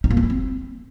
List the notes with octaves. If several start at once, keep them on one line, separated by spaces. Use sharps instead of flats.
D#4
A#3
D#4
E4
C4